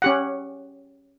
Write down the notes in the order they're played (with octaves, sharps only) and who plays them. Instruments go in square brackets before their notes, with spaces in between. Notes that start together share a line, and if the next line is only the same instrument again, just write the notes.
[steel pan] C#4 G4 F#5